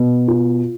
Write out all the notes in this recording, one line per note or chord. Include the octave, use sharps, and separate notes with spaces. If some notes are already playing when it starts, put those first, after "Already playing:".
Already playing: B2
F4